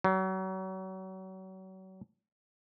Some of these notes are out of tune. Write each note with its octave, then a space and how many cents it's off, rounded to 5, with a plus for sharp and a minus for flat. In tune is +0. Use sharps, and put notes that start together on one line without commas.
F#3 +35